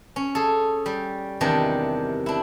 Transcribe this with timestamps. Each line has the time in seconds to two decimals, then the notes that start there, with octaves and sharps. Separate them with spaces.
0.16 C#4
0.35 G#4 A4
0.86 G3
1.41 E2 C3 D#3 D4 G4
2.26 D4 E4